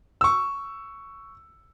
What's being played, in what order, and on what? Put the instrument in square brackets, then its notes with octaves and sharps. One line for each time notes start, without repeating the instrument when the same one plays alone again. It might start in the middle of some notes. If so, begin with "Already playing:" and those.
[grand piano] C#6 E6